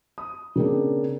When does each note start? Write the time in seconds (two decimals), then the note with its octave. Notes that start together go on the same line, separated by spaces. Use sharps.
0.18 D#6
0.56 C#3 A#3 C4 D4